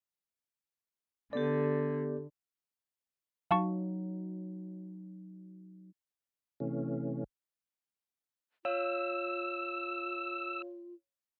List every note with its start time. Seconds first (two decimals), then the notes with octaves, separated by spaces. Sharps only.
1.33 D3 B3 G4 A4 D5
3.51 F#3 D#4 F5 A5 C#6
6.60 C3 E3 A3 C#4
8.65 F4 C#5 F5 E6